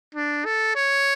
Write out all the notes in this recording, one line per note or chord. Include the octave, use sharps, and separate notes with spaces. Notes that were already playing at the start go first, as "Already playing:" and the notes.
D4
A4
C#5